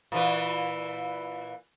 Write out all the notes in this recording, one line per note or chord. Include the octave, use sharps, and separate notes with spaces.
A#2 E3 B4